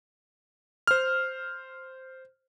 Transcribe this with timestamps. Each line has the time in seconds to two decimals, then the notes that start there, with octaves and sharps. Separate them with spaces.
0.87 C5 F6